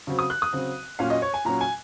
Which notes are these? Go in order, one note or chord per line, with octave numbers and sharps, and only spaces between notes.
C#3 F#3 C4
D#6
F#6
D#6
C#3 F#3 C4
A#2 F#3 C#4 F5
D#5
C#5
G#5
A#2 F#3 C#4 A#5
G#5